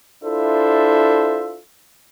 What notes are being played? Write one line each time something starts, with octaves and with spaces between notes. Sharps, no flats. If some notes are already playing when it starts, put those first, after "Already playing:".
D4 E4 F4 A4 C5 E5